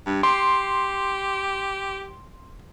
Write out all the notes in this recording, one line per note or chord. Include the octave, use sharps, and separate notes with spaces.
G2
G4 C6